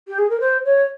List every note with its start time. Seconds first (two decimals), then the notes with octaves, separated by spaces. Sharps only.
0.08 G4
0.18 G#4
0.30 A#4
0.40 C5
0.65 C#5